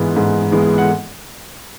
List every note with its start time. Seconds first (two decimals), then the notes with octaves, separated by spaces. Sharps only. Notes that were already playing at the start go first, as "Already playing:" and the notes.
Already playing: G#2 E3 G#3 B3
0.16 G#2
0.52 E3 G#3 B3
0.78 F#5